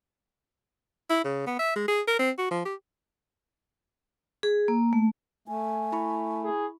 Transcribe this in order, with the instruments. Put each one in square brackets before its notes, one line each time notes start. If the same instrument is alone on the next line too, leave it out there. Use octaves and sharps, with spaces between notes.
[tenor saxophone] E4
C#3
B3
E5
G#3
G#4
A#4
C4
F#4
F3
G4
[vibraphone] G#4
A#3
A3
[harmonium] A3 [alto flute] G#5
[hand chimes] E4 B5 C#6
[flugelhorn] G#4